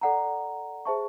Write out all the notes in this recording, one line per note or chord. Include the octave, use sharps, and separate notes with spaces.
A4 D5 F#5 A#5
G#4 C5 E5 A5 C#6